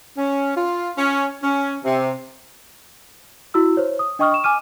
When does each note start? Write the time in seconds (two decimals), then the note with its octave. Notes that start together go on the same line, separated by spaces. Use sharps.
0.18 C#4
0.57 F4
0.98 C#4
1.43 C#4
1.85 C3
3.54 E4 F#4 E6
3.77 C5 C#5
3.99 D#6
4.19 D4 D#5 G5 C#6 D#6 F6
4.31 C#6 E7
4.44 G#5 D6 F6 D#7